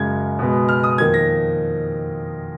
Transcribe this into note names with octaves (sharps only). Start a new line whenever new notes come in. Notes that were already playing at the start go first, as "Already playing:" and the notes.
Already playing: F#2 C#3 G#3 G#6
B2 G#3 B3
F6
D#6
F2 D#3 A#3 G#6
A#6